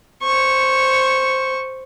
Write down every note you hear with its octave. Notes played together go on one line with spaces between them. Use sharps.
C5 C#6